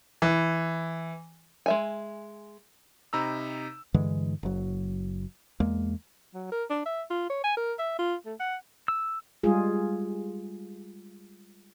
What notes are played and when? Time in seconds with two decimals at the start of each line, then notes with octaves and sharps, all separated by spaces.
0.22 E3
1.66 G#3 E5 G#5
3.13 C3 D#4 A#5 B5 E6
3.94 G2 D3 E3 G#3
4.43 F#1 F#3
5.60 E2 G#3 A#3
6.34 F#3
6.52 A#4
6.70 D4
6.86 E5
7.10 F4
7.30 C#5
7.44 G#5
7.57 A#4
7.79 E5
7.99 F4
8.26 A3
8.40 F#5
8.88 E6
9.43 G3 G#3 F4 G#4